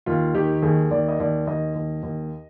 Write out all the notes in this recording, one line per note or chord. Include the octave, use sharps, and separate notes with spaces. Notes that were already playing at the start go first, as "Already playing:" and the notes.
D#2 F4
D#3 G4
D#2 G#4
D#2 D5
D#5
D#2 D5
D#2 D#5
D#2
D#2